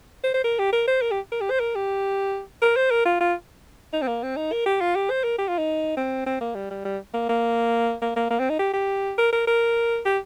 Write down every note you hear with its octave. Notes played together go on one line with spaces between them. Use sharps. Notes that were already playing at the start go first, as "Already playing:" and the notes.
C5
C5
A#4
G4
A#4
C5
A#4
G4
A#4
G4
C5
A#4
G4
A#4
C5
A#4
F4
F4
D#4
C4
A#3
C4
D#4
A#4
G4
F4
G4
C5
A#4
G4
F4
D#4
C4
C4
A#3
G3
G3
G3
A#3
A#3
A#3
A#3
A#3
C4
D#4
G4
G4
A#4
A#4
A#4
G4